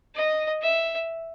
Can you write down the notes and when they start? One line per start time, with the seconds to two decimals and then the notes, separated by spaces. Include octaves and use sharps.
0.15 D#5
0.62 E5